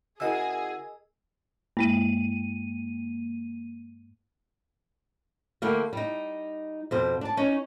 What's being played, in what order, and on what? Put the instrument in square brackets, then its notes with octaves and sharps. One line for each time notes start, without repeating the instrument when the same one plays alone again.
[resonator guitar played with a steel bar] C#3 E4 F#4 [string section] G#4 [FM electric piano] A#4 D#5 E6
[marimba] G2 G#3 [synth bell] A#3 D#7
[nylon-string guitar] D3 G3 A3 A#3
G3 D#4
F2 B2 C5
D4 A5
C#4 D#4